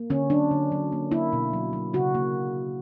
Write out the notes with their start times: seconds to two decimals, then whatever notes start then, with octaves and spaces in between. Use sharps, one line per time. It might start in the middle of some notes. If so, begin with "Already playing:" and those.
Already playing: A#3
0.10 D3 C#4
0.30 F#3 D4
0.51 D3
0.72 F#3
0.92 A#3
1.12 A#3 E4
1.33 B2
1.53 F#3
1.73 F#3
1.93 C#3 F#4
2.15 A#3